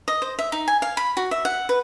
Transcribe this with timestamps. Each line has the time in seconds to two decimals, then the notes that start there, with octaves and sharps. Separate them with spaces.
0.08 D#5
0.22 C5
0.39 E5
0.52 D#4
0.68 G#5
0.82 F5
0.97 B5
1.17 F#4
1.31 E5
1.45 F#5
1.69 B4